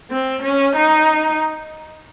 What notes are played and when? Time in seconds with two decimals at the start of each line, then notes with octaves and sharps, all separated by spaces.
0.11 C4
0.42 C#4
0.75 D#4